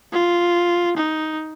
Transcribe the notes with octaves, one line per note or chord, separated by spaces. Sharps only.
F4
D#4